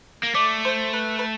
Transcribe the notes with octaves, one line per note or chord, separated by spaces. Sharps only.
A#3
A3 D5
C5
B4
B4